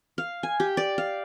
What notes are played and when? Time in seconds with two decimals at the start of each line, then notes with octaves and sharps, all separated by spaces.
0.18 F5
0.43 G#5
0.60 G4
0.77 D5
0.98 F5